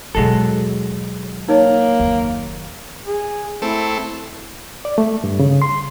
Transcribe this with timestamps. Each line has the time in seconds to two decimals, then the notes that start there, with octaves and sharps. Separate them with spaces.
0.15 D#2 B2 F#3 G#3 A4
1.48 A#3 D#4 C#5 D#5
2.00 F#1 D#2
3.07 G#4
3.62 A3 C4 E4 A4
4.85 D5
4.98 A3
5.24 G2
5.40 C#3
5.62 C6